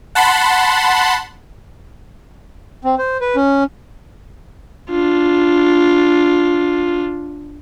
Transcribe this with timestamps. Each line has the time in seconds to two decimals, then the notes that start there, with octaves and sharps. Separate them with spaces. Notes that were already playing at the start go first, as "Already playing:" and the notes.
0.15 F#5 A5 B5 C6
2.84 C4
2.98 C5
3.21 B4
3.36 C#4
4.90 D4 F4